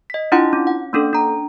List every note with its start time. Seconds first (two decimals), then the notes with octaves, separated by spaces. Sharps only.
0.10 D#5 B6
0.32 D4 E4 F4 F#5 C6
0.53 C#4
0.67 F#5
0.93 A#3 C#4 D4 A4
1.13 D4 A#5